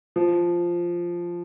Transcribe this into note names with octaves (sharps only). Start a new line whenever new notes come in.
F3